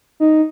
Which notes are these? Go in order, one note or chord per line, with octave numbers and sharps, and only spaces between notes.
D#4